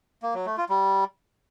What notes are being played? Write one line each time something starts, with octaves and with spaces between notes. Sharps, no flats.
A#3
F#3
A3
F4
G3